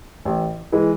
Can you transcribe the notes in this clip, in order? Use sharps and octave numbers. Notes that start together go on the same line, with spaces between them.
A1
E3 G#3